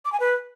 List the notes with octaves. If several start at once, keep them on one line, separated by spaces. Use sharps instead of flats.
D6
G#5
B4